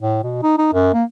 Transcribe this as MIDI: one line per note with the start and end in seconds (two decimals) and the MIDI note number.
0.02 0.19 45
0.23 0.39 47
0.43 0.54 63
0.58 0.69 63
0.73 0.93 42
0.93 1.04 58